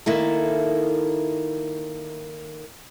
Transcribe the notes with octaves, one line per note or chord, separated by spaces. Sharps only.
D#3 A#3 E4 A4